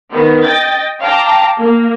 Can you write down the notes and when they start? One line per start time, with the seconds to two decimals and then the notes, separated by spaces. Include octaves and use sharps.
0.12 D#3 B3
0.44 D#5 G5 A6
1.02 F5 G5 A5 A#5 D6
1.59 A#3